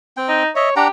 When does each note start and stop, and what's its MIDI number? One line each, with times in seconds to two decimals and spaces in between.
0.17 0.43 60
0.17 0.43 79
0.29 0.49 63
0.56 0.76 73
0.56 0.70 75
0.56 0.70 76
0.76 0.88 62
0.76 0.90 67
0.76 0.88 78
0.76 0.88 82